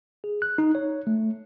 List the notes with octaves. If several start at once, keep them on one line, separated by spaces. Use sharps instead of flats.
G#4
F#6
D#4
C#5
A3